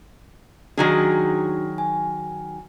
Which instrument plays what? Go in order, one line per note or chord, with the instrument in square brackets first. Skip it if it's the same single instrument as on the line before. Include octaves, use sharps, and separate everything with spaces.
[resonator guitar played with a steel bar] D#3 F#3 G#4 [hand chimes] D4 D#4 F#4
[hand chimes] G#5